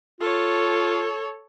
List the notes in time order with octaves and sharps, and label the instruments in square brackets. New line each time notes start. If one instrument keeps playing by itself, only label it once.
[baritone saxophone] F4 [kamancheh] A4 C#5